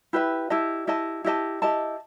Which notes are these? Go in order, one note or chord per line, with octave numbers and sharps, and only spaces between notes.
E4 G4 B4 E5
E4 G4 D#5 A5
E4 G4 D#5 A5
E4 G4 D#5 A5
E4 G4 D#5 A5